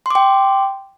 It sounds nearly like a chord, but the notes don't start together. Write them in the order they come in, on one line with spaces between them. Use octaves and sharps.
C6 D6 G5